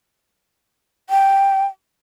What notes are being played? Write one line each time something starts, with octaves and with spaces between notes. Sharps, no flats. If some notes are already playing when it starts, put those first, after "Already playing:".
G5